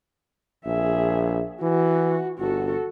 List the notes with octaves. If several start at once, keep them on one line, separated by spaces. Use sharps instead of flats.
A#1 G#4 E5
E3 F#4
G1 F#4 A4